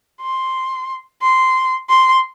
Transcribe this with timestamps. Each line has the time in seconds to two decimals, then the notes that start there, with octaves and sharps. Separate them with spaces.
0.21 C6
1.22 C6
1.89 C6